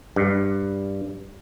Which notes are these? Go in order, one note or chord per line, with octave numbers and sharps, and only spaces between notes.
G2